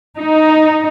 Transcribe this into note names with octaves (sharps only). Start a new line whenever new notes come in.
D#4